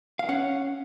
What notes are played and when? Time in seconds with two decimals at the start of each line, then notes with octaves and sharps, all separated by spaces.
0.19 F5
0.29 C#4 F#5